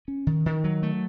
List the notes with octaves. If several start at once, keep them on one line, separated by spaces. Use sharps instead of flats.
C#4
D#3
D#3
F#3
A3